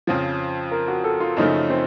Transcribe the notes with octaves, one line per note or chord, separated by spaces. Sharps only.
F2 C#3 F3
A#4
F#4
A4
F4
F#2 C#3 F3 A3 D#4
C4